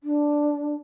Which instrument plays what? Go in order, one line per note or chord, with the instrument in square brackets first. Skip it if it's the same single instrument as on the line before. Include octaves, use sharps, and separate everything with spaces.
[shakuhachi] D4